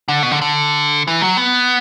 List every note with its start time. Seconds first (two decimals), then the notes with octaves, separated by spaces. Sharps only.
0.08 D3
0.23 B2
0.31 D3
0.41 D3
1.07 E3
1.22 F#3
1.37 B3